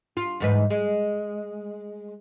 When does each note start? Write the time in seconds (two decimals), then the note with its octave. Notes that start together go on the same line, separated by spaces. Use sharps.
0.17 F4
0.40 E2 G#2 B4
0.70 G#3